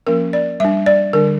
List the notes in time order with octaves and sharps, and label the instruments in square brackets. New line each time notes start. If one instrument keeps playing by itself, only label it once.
[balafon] F3 A#3 C#4 A#4
D5
G3 D4 E5
D5
D3 G3 D4 A#4